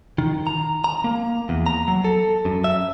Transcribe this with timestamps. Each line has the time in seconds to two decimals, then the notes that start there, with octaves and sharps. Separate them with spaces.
0.18 D#3
0.47 A#5
0.84 A#5
1.04 A#3
1.49 E2
1.66 A#5
1.88 F#3
2.04 A4
2.45 F#2
2.64 E5